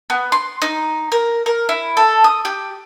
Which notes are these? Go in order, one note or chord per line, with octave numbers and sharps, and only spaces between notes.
B3
C6
D#4
A#4
A#4
E4
A4
D#6
G4